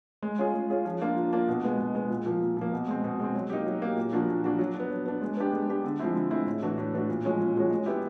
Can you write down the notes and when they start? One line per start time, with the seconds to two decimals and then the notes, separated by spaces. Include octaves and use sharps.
0.22 G#3
0.39 C#4 F4 G#4
0.54 G#3
0.70 C#4 F4 G#4
0.85 F3
1.01 A#3 D4 F4
1.16 F3
1.33 A#3 D4 F4
1.48 B2
1.64 G#3 B3
1.79 B2
1.95 G#3 B3
2.10 A#2
2.26 F3 A#3
2.41 A#2
2.57 F3 A#3
2.72 B2
2.88 G#3 C4
3.04 B2
3.20 G#3 C4
3.35 F#3
3.50 A#3 D#4 G4
3.66 F#3
3.82 A#3 D#4 G4
3.96 A#2
4.13 F3 A#3 D4 F#4
4.29 A#2
4.44 F3 A#3 D4 F#4
4.59 F#3
4.75 B3 D4
4.90 F#3
5.06 B3 D4
5.22 G#3
5.37 B3 D4 G4
5.53 G#3
5.68 B3 D4 G4
5.84 D3
5.99 F3 G#3 C4 E4
6.15 D3
6.30 F3 G#3 C4 E4
6.46 A2
6.62 E3 A3 D4 F#4
6.78 A2
6.94 E3 A3 D4 F#4
7.09 A#2
7.24 F3 G#3 C#4 F#4
7.40 A#2
7.56 F3 G#3 C#4 F#4
7.70 G#3
7.86 B3 E4 G4